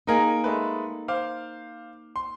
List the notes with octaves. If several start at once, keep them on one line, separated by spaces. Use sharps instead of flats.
A#3 D#4 G#4 A#4 D#5
G#3 A3 B4
C5 F5 D6
C6